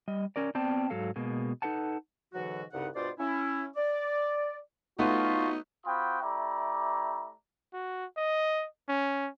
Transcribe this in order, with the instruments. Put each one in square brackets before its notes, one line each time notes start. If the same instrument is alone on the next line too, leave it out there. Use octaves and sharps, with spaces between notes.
[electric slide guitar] G3 D#5
C#4 A#4 D5
B3 C4 D5 G5 A5
G#2 F#3 A4 F5
B2 G#3 A#3
D#4 A4 B4 F#5 A5
[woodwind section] G#2 B2 D3 E3 F#3 F#4
C2 G2 C#3 D#4 F#5
G2 B2 F4 C5 D5
C#4 E4
D5
[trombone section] A2 F4 [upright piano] A3 B3 [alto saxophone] D#4 [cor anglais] F#4
[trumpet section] C4 F4 F#4 G5 B5 D#6
A3 E4 G4 D5 A#5
[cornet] F#4
D#5
C#4